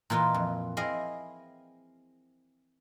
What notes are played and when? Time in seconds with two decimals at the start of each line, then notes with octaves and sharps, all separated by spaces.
0.10 A#2 E3 F4 B4 D#5
0.35 F2
0.77 C4 E4 G#4 D#5 F5